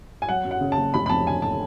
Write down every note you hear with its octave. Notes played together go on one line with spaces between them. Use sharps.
G#5
F#3 F#5
F#2
F#5
C#3
A5
F#1
F1 B5
B5
F2 A5
D3 G#5
A5